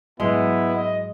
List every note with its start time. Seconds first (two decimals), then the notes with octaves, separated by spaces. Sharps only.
0.20 G#2 F#3 G#3 B3 E4
0.76 D#5